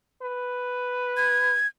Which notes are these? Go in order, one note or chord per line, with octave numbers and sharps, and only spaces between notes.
B4
G#6